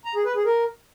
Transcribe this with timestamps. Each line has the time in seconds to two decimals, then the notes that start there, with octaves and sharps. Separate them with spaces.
0.05 A#5
0.15 G#4
0.25 B4
0.35 G#4
0.45 A#4